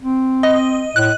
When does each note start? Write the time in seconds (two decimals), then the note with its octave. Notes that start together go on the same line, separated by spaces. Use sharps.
0.02 C4
0.43 D#5
0.96 A2 F#6